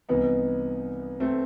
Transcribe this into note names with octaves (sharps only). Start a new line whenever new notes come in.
C2 C3 E3 B3 D#4
A3 C4